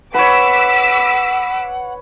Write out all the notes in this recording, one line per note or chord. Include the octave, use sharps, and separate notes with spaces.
B4 C#5 F#5 D6 E6 B6